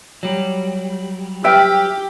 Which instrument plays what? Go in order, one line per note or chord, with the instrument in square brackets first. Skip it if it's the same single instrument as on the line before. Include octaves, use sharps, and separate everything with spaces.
[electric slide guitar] F#3 G3
[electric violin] G4 [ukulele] B4 E5 G5 [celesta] E6 F6